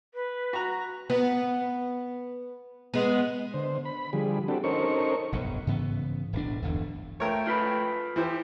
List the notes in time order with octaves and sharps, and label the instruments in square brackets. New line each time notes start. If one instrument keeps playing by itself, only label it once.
[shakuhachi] B4
[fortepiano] F#4 A#5
[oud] B3
G#3 B3
[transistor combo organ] D3 C5
B5
D3 F3 G3 G#4
C4 D4 F#4 G4 A4
C#4 D#4 A4 A#4 C5 C#6
[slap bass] F1 B1 G2
G#2 C#3 E3 B3
D1 B1 D4
D1 G1 E2
[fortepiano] F3 A#4 C#5 [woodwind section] A3 G5
[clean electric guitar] F4 B4 B5
[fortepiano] E3 E4 C5 [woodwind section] F3 G4